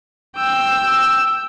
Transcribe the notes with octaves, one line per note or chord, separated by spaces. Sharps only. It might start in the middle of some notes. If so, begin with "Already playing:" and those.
G5 E6